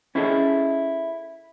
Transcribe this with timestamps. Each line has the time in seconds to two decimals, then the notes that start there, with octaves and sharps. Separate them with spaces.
0.15 C#4 E4 G#4 A4 B4 D#5